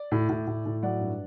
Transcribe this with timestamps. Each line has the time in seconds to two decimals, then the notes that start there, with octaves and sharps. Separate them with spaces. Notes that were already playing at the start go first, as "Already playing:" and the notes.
Already playing: D5
0.12 A2
0.29 A2
0.47 A2
0.66 A2
0.83 F#3 D5 F#5
1.01 G2